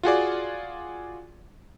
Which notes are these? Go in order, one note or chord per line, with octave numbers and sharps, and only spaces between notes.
F4 F#4 G#4 D5